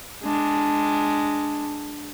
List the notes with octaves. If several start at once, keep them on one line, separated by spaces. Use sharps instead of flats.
G#3 D4